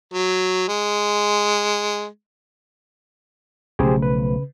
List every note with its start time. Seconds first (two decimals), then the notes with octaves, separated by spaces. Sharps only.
0.13 F#3
0.68 G#3
3.79 B1 C#3 F3 A3 G4 G#4 C5
4.02 B4